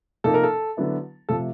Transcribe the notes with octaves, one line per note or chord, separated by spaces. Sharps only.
C3 F3 A#3 D#4 A4
A#4
A4
D3 F#3 B3 E4
C3 F3 A3 A4